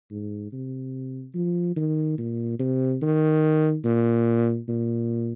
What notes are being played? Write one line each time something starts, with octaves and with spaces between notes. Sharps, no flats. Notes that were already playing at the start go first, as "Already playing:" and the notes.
G#2
C3
F3
D#3
A#2
C3
D#3
A#2
A#2